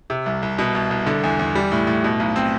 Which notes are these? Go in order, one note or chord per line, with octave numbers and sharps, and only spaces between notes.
C3
C2
C2
B2
C2
C2
D3
E2
E2
G3
A2
A2
B2
B1
C4